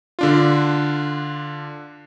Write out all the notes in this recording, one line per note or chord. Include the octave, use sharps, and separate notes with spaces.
D3 D4 F4